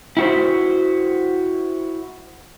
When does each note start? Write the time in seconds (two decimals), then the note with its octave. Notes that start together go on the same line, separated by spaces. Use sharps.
0.17 E4 F#4 C5